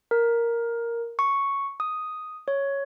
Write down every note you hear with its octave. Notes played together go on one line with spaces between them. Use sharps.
A#4
C#6
D#6
C#5